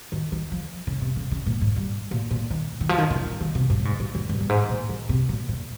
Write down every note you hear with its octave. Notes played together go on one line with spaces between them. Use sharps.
D#3
D#3
F3
C#3
C3
C#3
C#3
A#2
G#2
G2
A#2
A#2
D#3
D#3
F3
D#3
C#3
D#3
D#3
C3
G2
A#2
G#2
A#2
F2
G2
G2
G#2
A#2
D#3
C3
A#2
A#2